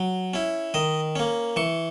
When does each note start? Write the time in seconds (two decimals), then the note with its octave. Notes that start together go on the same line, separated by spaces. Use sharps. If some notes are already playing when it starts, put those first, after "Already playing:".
Already playing: F#3
0.34 C#4 E4
0.74 D#3 D#5
1.16 A#3 C#4
1.56 E3 C#6